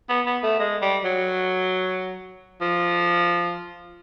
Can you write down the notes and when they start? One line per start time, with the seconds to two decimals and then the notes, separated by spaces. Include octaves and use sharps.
0.09 B3
0.26 B3
0.43 A3
0.60 G#3
0.82 G3
1.04 F#3
2.61 F3